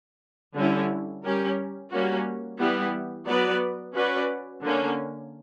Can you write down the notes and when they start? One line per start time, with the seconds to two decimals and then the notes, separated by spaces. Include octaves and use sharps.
0.56 D3 G3 C#4 E4
1.24 G3 C#4 G4 A#4
1.91 G3 A#3 C#4 F#4
2.59 E3 G3 B3 E4 G4
3.27 F#3 B3 F#4 B4 D5
3.95 C#4 F#4 B4 D5
4.63 D3 A#3 C#4